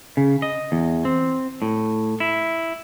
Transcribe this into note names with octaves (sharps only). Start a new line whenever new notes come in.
C#3
D#5
E2
C4
A2
E4